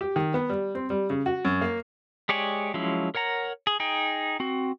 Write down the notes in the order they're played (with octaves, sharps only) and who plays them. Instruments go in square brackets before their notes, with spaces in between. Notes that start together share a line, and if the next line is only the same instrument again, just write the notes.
[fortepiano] G4
D#3
B3
G3
C4
G3
C#3
F#4
F#2
A#3
[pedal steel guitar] G#3 G4 C#5 D5 G#5
F3 F#3 G#3 C#4 E4
A#4 C#5 F#5 A#5
G#4
D#4 G#4 G5
C4 F#4